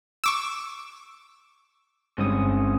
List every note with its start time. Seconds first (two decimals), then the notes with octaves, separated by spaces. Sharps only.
0.24 C#6 D6 E6
2.18 G1 G2 G#3 C4 C#4 D#6